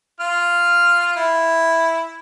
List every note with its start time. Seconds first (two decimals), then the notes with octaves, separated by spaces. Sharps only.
0.20 F4 F6
1.16 E4